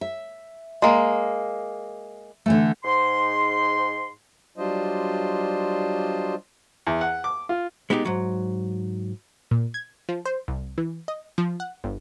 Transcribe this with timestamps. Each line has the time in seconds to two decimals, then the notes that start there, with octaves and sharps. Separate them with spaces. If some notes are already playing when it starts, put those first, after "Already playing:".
0.01 E5
0.82 G#3 A#3
2.46 D3 E3 A3
2.84 G#2 C6
4.57 F#3 G3 D4 F4 C5 D#5
6.87 E2
7.01 F#5
7.24 D6
7.49 F4
7.90 G#3 B3 D#4 F#4 G4
8.05 G#2 F#3
9.51 A#2
9.74 G#6
10.09 F3
10.26 C5
10.48 C2
10.78 E3
11.08 D#5
11.38 F3
11.60 F#5
11.84 G1